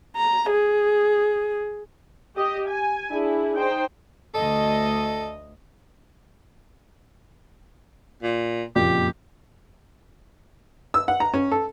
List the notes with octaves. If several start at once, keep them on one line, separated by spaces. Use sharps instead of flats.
A#5
G#4
G4 D#5
G#5
D4 E4 G#4
D#4 C5 G5
D2 A4 D#5
A#2
F#1 F2 A#2 G4
E6
F#5
A#5
C#4
A4